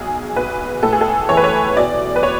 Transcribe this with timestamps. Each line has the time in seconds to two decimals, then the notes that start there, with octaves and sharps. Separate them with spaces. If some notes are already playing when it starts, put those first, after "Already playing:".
Already playing: B1 G#4
0.36 B1 B4
0.83 A2 A4
0.93 G#4
1.01 A4
1.29 E3 C#5
1.37 B4
1.44 C#5
1.77 B2 D5
2.16 B4
2.23 C#5